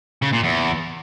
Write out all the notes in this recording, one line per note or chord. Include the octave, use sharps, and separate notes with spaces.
C#3
A#2
E2